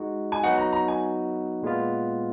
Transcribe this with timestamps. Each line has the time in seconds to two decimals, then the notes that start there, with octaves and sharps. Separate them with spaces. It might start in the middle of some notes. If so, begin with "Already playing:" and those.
Already playing: G#3 D#4 F#4
0.32 G#5
0.43 F#3 B3 D#4 F#4 F#5
0.58 A#5
0.72 A#5
0.88 G#5
1.63 A#2 G#3 B3 F4